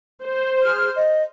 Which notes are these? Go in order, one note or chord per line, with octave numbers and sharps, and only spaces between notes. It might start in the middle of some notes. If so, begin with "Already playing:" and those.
C5
G#4 F6
D#5